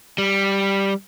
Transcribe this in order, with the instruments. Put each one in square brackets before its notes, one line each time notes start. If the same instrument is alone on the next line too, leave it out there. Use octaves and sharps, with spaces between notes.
[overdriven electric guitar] G3